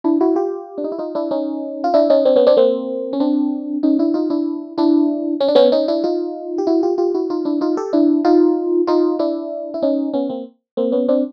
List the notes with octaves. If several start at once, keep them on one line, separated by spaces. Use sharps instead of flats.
D4 E4
E4 F#4
F4 G4
D4
D#4
E4
D#4 F4
D4 E4
C#4 D#4
F4
D4 E4
C#4 D#4
C4 D4
B3 C#4
C4 D4
A#3 C4
C#4
C4 D4
C#4 D#4
D4 E4
D#4 F4
D4 E4
D4 E4
C#4
D4
B3 C#4
C#4 D#4
D4 E4
D#4 F4
G4
E4 F#4
F4 G4
F4 G4
E4 F#4
D#4 F4
D4 E4
D#4 F4
G4 A4
D4 E4
D#4 F4
D#4 F4
D4 E4
E4
C#4 D#4
B3 C#4
A#3 C4
A#3 C4
B3 C#4
C4 D4